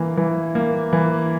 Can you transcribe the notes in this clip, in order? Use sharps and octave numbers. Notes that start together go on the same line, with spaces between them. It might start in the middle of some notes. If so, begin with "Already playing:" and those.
Already playing: E3 A#3
E3
A#3
E3